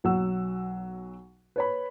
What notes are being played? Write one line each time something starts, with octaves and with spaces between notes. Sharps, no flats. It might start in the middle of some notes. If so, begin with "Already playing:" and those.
B1 F#3 F#5 E6
B4 C#5 B5